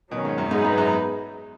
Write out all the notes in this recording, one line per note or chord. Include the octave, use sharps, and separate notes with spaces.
B2 D#3 F#3 C#4
G#2
F#2
G#2 F#3 B3 D#4 G#4 B4
G#2
F#2